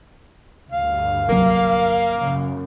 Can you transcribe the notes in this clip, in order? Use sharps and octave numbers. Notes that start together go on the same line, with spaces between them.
D2 G2 F5
G1 C2 F#3 A#3
F#2 C#3